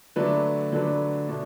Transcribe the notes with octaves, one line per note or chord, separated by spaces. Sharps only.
D3 F#3 A3 D4 B4
D3 F#3 A3 D4 B4
B2 A3 D4